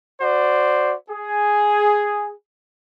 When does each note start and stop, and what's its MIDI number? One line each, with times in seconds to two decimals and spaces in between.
0.21 0.93 66
0.21 0.93 72
0.21 0.93 74
1.09 2.32 68